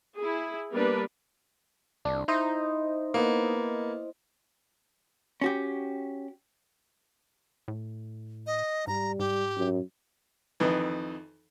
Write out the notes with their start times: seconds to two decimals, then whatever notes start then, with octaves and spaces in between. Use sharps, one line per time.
0.17 E4 G#4
0.73 G3 A#3 B3 D4 A#4 B4
2.05 C2 D4
2.28 D#4 E4 C5 D#5
3.14 A#3 B3
5.41 C#4 F#4 G4
7.68 A2
8.46 D#5
8.87 G#2 G3 A#5
9.19 G#2 G4
9.56 F#2
10.60 F2 D#3 E3